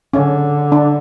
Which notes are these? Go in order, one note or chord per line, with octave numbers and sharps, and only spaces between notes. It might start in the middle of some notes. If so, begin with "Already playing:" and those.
D3 C#4
D4